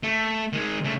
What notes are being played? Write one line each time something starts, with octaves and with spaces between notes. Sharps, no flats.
A3
D#3 G#3
C#3 A3